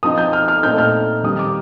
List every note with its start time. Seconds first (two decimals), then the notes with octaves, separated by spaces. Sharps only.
0.03 F3 C4 D#4 D#6
0.18 G6
0.33 F6
0.48 F6
0.63 A#2 A3 C4 D#4 G6
0.78 F6
1.23 D#3 G3 C4 D#4 D#6
1.39 D6